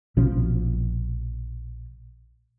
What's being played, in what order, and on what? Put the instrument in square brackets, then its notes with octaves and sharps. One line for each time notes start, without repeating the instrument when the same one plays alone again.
[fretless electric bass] A#1 B2 F3 C#4